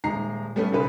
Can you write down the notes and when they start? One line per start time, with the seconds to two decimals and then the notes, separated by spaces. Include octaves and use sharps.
0.04 D#1 G#3 A#5 C7
0.56 G3 A3 B3 C#4
0.72 B1 C#3 B4 C5